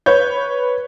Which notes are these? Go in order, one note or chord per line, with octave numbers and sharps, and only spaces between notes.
B4 C#5 G6